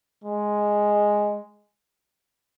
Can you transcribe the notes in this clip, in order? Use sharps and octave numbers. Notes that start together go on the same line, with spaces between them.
G#3